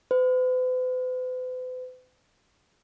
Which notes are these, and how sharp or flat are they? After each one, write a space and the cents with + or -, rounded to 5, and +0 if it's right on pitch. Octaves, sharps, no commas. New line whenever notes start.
B4 +45